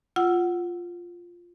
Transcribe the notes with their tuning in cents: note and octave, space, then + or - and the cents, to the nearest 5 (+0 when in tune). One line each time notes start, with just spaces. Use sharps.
F4 +0 F#5 +5 E6 +0